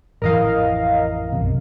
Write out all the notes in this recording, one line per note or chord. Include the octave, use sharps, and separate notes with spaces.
A1 F2 E3 A#4 D#5 F5
B1 F#2 C3